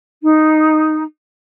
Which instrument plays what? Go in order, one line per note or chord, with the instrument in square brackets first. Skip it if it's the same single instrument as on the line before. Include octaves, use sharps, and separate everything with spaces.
[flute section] D#4